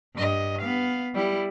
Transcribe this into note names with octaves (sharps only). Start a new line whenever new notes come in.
G2 D#5
B3 F5
G3 E4